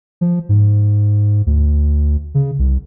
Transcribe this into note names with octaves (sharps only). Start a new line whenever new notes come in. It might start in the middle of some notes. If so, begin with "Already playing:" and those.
F3
G#2
D2
C#3
C2